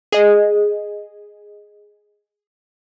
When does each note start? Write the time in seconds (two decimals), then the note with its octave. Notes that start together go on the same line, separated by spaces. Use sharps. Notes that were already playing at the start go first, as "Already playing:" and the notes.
0.12 G#4 D#5